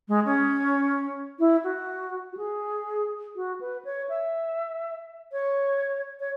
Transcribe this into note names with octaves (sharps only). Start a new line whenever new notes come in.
G#3
C#4
E4
F#4
F#4
G#4
F#4
B4
C#5
E5
C#5
C#5